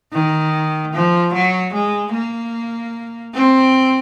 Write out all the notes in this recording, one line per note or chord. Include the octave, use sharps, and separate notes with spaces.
D#3
F3
F#3
G#3
A#3
C4